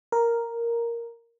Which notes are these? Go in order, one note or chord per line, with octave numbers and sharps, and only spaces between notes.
A#4